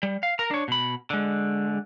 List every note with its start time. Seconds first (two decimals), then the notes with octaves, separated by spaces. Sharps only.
0.03 G3
0.23 F5
0.39 A#4 A#5
0.51 D4 C#5
0.68 B2 B5
1.10 D3 G#3